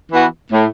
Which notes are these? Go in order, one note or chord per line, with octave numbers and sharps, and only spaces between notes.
E3 B3 F#4
A2